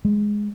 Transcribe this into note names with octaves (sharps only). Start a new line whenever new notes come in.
G#3